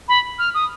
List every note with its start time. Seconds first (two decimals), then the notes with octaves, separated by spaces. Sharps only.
0.08 B5
0.39 F6
0.54 D#6